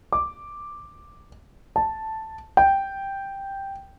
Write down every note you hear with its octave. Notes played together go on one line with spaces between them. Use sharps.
D6
A5
G5